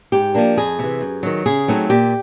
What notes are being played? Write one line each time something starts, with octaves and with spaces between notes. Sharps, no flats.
G#2 G4
F3 A#3 D4
F2 G#4
C3 E3
F#2
D#3 F#3
C#3 G#4
F#3 A3 C4 D#4
A#2 G4